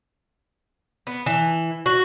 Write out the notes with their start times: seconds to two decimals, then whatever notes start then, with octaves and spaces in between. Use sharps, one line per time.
1.07 B3
1.26 E3
1.86 F#4